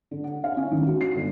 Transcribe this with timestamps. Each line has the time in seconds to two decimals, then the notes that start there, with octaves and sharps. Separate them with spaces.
0.11 D3
0.24 F#5
0.44 F5
0.57 C#4
0.71 D#3
0.87 F#4
1.01 C7
1.15 G1